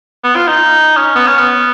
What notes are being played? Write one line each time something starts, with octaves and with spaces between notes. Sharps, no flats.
B3
F4
D#4
C#4
B3
C#4
B3